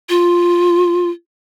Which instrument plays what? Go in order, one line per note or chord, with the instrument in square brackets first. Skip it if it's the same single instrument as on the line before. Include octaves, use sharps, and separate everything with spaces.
[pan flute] F4